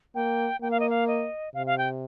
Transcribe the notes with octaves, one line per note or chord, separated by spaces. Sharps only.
A#3 G5
A#3 G5
F5
D#5
F5
D#5
C3 F5
F5
G5